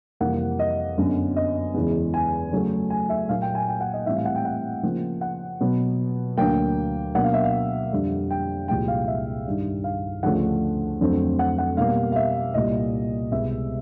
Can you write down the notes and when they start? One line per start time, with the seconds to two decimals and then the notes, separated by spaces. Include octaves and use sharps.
0.20 F2 C3 E3 G3 A#3 F#5
0.59 D#5
0.98 F#2 D3 F#3 B3
1.36 D#5
1.74 E2 C#3 E3 G#3 B3
2.14 G#5
2.52 C#3 F#3 A3
2.90 G#5
3.10 E5
3.29 A#2 F#3 A#3 F5
3.42 G5
3.55 G#5
3.68 G5
3.81 F#5
3.94 D#5
4.06 A2 E3 G3 C4 E5
4.16 F5
4.25 F#5
4.36 G5
4.45 F#5
4.83 C#3 F3 A#3
5.21 F#5
5.60 B2 F#3 B3
6.37 D2 D3 F#3 A#3 G5
7.15 B2 F#3 A#3 D4 F#5
7.24 F5
7.34 E5
7.44 F5
7.92 F2 D3 G3
8.30 G5
8.68 C2 A#2 F3 G#3 G5
8.88 F5
9.07 E5
9.46 G2 D#3 G3
9.84 F5
10.23 D2 C#3 F3 A3 D4 F#5
11.00 F2 D3 F#3 A3 C4
11.39 F#5
11.58 F#5
11.77 B2 G3 A#3 F5
12.12 F5
12.16 E5
12.54 C2 A#2 G3 D#5
13.32 C2 B2 G#3 B3 E5